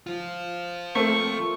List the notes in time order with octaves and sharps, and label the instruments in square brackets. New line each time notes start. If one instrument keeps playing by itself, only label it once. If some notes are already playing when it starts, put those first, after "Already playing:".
[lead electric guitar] F3 F4
[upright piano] A3 A#3 C4 [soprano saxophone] C#6